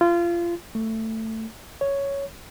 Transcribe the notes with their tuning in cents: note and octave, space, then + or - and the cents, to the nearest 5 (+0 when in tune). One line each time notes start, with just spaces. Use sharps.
F4 -25
A3 +15
C#5 +5